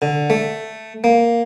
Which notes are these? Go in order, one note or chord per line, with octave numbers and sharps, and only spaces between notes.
D3
A3
A#3